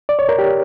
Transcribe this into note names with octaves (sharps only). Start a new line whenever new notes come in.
D5
C#5
A#4
G4